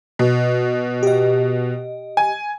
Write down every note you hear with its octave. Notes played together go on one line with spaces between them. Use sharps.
B2
G4 D#5
G#5